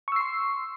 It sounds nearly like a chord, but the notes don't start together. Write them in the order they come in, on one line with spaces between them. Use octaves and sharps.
C#6 E6 C7 C6